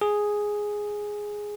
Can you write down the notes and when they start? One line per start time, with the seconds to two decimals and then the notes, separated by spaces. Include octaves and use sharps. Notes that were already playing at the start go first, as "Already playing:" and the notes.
0.01 G#4